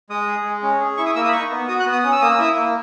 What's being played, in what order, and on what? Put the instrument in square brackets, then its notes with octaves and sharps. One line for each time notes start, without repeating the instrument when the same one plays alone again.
[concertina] G#3 D#6
G#4
G#3
C#4
G#4
E4 C#6
D#6
A#3 E6
D#6
B5
D#4 C#6
B3
F#4 D#6
F#6
B3
D#6
C#4 D#6
E6
A#3 D#6
E6
E4 D#6
A#3